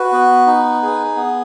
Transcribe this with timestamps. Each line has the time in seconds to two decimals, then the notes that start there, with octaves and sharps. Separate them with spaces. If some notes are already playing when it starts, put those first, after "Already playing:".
Already playing: F#4 B4
0.12 B3
0.47 D#4
0.82 G#4
1.16 B3